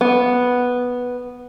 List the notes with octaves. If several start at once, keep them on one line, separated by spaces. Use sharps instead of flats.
B3